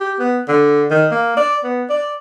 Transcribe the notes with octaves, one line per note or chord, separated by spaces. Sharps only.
G4
B3
D3
D#3
A#3
D5
B3
D5